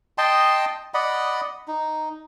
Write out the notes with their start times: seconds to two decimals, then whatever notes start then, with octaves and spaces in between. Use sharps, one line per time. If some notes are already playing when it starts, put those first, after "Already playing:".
0.18 D#5 G5 A5 C6
0.94 D5 D#5 F#5 B5
1.68 D#4